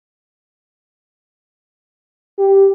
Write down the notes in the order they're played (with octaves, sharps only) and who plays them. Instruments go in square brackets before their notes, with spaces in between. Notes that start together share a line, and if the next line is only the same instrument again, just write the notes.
[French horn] G4